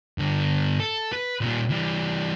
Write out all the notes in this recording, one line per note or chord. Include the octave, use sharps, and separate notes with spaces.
G2 D3
A4
B4
A#2 G3
E3 G3